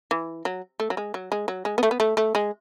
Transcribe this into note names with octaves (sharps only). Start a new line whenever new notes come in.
E3
F#3
A3
F#3
G#3
F#3
G#3
F#3
G#3
B3
A3
B3
A3
A3
G#3